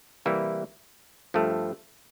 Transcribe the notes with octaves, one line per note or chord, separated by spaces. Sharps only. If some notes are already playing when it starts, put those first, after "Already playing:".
C3 E3 G3 A#3 E4
G2 F3 A3